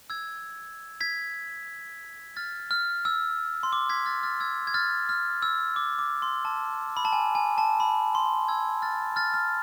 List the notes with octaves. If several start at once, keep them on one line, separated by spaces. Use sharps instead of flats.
E6 G#6
G#6 B6
F6 A6
F6
E6
C6
D6
G#6 B6
F6 A6
F6 A6
E6 G#6
G#6
F6 A6
F6
E6
D6
D6
C6
A5
B5
A5
G#5
G#5
A5
B5
C6
E6 G#6
F6 A6
F6 A6
F6